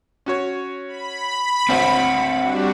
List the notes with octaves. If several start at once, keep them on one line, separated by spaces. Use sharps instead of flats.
C#4 F#4 C#5
B5
G#1 D2 C4 C5 C#5 F#5
G3 D4 F#4